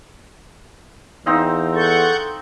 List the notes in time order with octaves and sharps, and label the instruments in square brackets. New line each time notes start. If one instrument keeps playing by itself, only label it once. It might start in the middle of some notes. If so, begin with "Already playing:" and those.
[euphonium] E2 [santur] C4 D#4 F5
[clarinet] A4 [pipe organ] F#5 C#6 G6